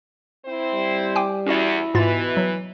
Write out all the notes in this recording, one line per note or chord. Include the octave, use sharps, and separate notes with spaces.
C4 E4 C5
G3
G5 G#5 D6
E2 C#4 E4 F#4 D5
G#2 B2 E3 F4 B4 A6
F#3